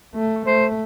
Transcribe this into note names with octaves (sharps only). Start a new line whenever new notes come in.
A3
A3 C5